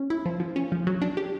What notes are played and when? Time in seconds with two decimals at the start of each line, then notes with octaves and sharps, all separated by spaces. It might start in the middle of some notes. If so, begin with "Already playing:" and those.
Already playing: C#4
0.10 E4
0.26 F3
0.40 F3
0.56 C#4
0.72 F3
0.87 F#3
1.02 D4
1.17 G4